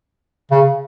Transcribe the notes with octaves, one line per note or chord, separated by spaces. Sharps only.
C#3